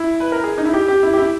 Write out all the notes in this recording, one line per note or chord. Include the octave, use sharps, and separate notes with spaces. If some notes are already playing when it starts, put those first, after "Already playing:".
Already playing: E4
B4
A#4
G#4
D#4
E4
G4
G4
E4
G4
E4